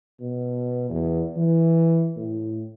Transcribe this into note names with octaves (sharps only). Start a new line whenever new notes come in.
B2
E2
E3
A2